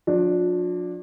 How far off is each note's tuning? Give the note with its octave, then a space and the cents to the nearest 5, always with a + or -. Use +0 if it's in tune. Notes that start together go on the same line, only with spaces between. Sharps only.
F3 +45 D4 +0